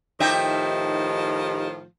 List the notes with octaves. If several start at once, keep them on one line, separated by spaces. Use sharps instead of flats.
A2 D#3 F3 D#4 G4 E5